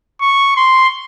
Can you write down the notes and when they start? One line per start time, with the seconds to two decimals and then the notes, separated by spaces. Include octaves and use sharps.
0.21 C#6
0.57 C6